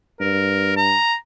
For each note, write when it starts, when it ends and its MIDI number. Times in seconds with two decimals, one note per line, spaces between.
0.20 0.95 43
0.20 0.74 70
0.77 1.15 82